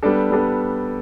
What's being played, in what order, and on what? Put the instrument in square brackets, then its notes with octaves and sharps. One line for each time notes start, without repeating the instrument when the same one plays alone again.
[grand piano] G3 B3 D4 A4
G3 B3 D4 A4